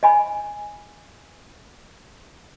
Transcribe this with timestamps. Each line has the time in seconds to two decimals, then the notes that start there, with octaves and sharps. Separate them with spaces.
0.03 D#5 G#5 B5